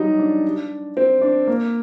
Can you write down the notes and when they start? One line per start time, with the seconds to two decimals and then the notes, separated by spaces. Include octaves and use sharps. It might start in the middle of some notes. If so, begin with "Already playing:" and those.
Already playing: F#3 G3 D#4
0.19 D4
0.97 C4
1.21 D4
1.47 A#3